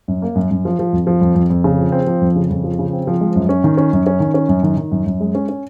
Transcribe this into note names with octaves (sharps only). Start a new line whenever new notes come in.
F#2
A#3
F#2
F#2
F3
F3
F2
F3
F2
F2
F2
C#3
F3
C4
F3
F2
C#3
F2
F3
C#3
C4
F3
G#3
F#2
C#4
D#3
C#4
F#2
C#4
D#3
C#4
F#2
D#3
D#3
F#2
F#2
G#3
C#4
C#4